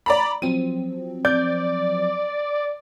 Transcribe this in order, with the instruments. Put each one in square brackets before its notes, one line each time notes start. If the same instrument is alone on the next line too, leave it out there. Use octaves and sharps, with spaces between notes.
[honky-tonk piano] D5 A#5 B5
[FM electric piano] F3 F#3 C4 [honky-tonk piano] D#7
[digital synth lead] D5 [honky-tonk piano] G6